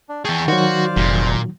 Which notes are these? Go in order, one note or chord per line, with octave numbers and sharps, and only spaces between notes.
D4
E3 G#4 G5 A5 C#6
D#3 F#3 F#4 C5 D5 F5
F1 A#2